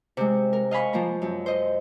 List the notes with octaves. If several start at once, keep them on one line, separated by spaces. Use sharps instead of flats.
C3 G#3
A#4
D#5 F5 G#5 B5 C#6
F3 A#3 A#5
F#2
C5 D#5